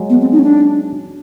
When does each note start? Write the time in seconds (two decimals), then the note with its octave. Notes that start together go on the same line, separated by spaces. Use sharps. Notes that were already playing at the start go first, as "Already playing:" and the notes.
Already playing: F#3 G#3
0.10 B3
0.21 C4
0.32 D#4
0.39 C#4
0.43 D4